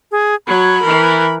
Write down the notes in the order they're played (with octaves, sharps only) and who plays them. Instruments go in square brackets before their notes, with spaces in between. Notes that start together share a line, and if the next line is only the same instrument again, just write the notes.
[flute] G#4
[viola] F#3 C#5 [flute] B5
[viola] E3 A#4